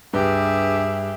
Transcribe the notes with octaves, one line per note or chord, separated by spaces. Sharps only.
C#2 G2 D4 G4 G#4 B4 E5